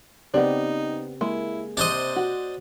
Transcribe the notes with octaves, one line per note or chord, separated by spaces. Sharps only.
C#3 B3 C4 D#4 G4 D5
G#3 A#3 E4
C3 D4 C5 D#5
F#4